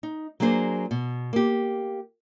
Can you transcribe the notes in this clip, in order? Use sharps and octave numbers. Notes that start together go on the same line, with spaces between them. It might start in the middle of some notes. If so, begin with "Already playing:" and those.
D#4
F#3 A#3 D4 G#4 C5
B2
A#3 G4